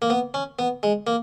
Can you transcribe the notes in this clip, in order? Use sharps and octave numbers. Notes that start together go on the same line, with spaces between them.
A#3
B3
C#4
B3
G#3
A#3